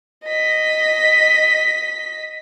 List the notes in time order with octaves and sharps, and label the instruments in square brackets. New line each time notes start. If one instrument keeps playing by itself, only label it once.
[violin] D#5 B6